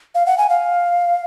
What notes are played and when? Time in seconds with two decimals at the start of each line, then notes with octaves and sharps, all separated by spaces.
0.15 F5
0.26 F#5
0.38 G#5
0.49 F5